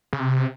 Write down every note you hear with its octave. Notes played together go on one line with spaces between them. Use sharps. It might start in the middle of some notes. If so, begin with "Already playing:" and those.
C#3
C3